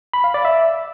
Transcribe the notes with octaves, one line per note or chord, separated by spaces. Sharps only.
B5
F5
D5
E5